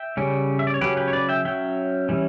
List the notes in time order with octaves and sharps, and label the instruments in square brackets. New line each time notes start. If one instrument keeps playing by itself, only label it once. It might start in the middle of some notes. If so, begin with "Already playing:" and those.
Already playing: [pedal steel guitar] E5 G5
C#3 G3 C#4
E5
D5
C#5
C#3 F#3 C#4 G4 B4
G4 B4
C#5
B4 D5
E5 G5
F#3 C#4 E5 G5
E3 G3 C#4